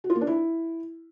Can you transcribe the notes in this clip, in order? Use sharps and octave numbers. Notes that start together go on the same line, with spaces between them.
F#4
F4
A#3
D4
E4